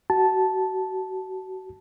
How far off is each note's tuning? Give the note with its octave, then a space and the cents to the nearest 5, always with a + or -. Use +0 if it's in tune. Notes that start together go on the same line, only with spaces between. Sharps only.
F#4 +30 A5 -10